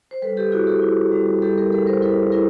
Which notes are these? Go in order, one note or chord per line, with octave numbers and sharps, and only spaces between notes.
C5
G3 A4 B4
G4 A4
E4 F#4 G#4
G4 A4
E4
G3
G3 G4 A4
G#4 A#4
G3 A4 B4
A#4 C5
E4 A4 B4
E4 G#4 A#4